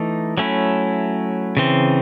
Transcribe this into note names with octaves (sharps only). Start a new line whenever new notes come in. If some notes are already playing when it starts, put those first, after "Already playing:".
Already playing: E3 A3 D#4
F#3 A3 C#4 E4
C#3 E3 C4